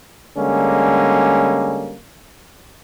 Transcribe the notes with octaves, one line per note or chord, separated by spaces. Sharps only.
D3 G3 G#3 A#3 C#4